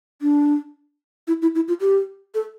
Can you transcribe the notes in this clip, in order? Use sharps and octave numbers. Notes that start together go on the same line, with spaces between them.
D4
E4
E4
E4
F4
G4
A4